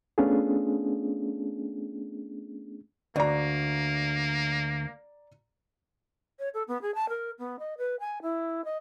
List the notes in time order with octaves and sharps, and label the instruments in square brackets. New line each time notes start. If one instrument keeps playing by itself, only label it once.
[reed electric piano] A3 B3 C#4 D4 F4 G#4
[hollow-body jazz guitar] D2 [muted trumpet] A#3 [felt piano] D5 A#5
[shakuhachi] C#5
A4
B3
G#4
A5
A#4
B3
D#5
B4
G#5
E4
D#5